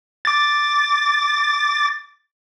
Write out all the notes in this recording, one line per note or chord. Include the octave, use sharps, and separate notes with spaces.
D6 A6